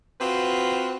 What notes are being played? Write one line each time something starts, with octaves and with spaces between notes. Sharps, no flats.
C4 F4 F#4 B4